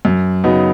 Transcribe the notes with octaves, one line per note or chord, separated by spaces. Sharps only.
F#2
C#3 F#3 B3 D#4